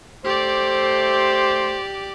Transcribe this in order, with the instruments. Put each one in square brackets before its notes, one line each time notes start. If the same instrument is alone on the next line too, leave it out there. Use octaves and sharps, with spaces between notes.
[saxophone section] A3 C5 [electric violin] G4 D5